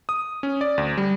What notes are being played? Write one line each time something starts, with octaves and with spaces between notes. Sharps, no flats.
D#6
C#4
D5
D2
G3